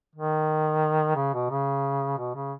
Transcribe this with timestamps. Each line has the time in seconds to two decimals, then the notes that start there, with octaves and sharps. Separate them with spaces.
0.15 D#3
1.16 C#3
1.34 B2
1.50 C#3
2.18 B2
2.35 C#3